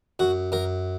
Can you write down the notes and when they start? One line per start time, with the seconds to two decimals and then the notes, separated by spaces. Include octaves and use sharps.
0.19 F#2 F#4
0.52 F#2 A#4